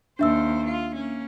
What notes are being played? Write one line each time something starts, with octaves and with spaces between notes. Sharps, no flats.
D#2 D4 C5 E5 E6
F4
A#3 C#4